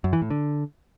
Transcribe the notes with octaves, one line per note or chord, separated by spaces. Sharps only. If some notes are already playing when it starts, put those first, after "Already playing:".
F#2
E3
A2
D3